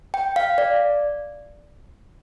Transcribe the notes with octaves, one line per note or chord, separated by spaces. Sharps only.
G5
F5
D5